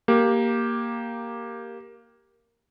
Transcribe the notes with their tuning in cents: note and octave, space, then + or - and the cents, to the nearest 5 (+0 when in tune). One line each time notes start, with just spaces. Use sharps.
A#3 +0 G4 +0